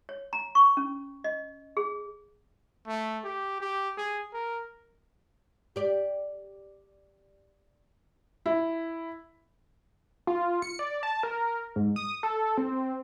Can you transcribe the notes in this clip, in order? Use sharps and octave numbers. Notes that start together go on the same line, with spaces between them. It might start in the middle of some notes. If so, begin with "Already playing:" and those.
C#5
A#5
C#6
C#4
D#5
G#4
A3
G4
G4
G#4
A#4
G4 D5
E4
F4
C#7
D5
A5
A#4
G#2
D#6
A4
C4